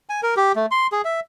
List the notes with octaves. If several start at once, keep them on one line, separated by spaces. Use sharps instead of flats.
G#5
A#4
G4
A3
C6
G#4
E5